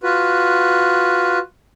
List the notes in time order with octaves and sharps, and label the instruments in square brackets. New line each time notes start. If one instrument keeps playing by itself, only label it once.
[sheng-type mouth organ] F4 F#4 B4